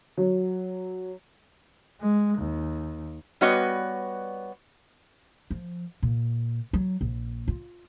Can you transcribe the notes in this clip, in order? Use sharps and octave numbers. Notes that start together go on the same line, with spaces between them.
F#3
G#3
D#2
G3 B3 F#4 B4 C#5 D#5
F3
A#2
F#3
A#1
F4